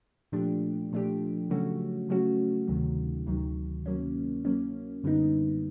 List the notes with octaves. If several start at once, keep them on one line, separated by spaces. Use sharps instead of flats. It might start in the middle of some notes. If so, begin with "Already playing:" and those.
A#2 F3 A3 D4 G4
A#2 F3 A3 D4 G4
C#3 F#3 A3 C#4 F#4
C#3 F#3 A3 C#4 F#4
D2 C3 D#3 F#3
D2 C3 D#3 F#3
F#3 A#3 C#4
F#3 A#3 C#4
F#2 D3 G3 B3 D#4